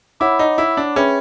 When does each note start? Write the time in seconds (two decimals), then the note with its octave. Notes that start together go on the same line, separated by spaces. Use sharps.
0.20 E4 C#5 F#5 B5 D6
0.39 D#4
0.58 E4
0.77 D4
0.96 C#4 G#4 B4 E5 G5 B5